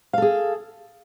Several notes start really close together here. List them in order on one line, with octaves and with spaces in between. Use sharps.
F5 A4 G#4